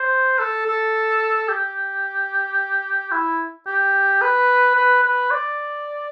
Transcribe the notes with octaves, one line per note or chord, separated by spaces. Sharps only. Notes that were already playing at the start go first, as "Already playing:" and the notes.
Already playing: C5
A4
A4
G4
E4
G4
B4
B4
B4
D5